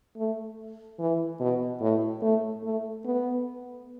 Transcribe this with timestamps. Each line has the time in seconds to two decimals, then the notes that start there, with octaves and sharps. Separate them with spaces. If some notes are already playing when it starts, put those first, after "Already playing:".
0.17 A3
0.99 E3
1.40 B2
1.81 A2
2.22 A3
2.64 A3
3.05 B3